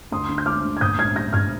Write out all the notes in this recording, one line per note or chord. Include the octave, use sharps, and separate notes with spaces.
D2 C6 D#6
D3
G6
G#3 D6 F6
D2
G#6
A#1 D#6 G6
G#2 F6 G#6
G3 G6 A#6
A#1 F6 G#6